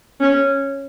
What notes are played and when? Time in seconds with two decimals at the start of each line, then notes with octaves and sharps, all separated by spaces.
0.21 C#4